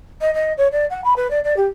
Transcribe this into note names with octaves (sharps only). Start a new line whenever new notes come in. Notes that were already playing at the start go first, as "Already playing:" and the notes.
D#5
D#5
C#5
D5
F#5
B5
B4
D5
D5
G4